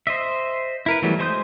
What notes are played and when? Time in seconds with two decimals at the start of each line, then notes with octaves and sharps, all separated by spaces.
0.07 C5 D#5 E5
0.86 E4 A#4 B4
1.02 E3 F#3 G3 A3 B3
1.19 G#3 C5 C6 D#6 G6